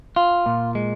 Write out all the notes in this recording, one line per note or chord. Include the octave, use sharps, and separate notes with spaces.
F4
A#2
G#3